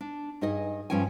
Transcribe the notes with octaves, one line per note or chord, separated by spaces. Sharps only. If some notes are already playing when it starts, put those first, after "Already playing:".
D4
G2 D#4 G#4 D#5 G#5
G2 F3 C#4 G5 G#5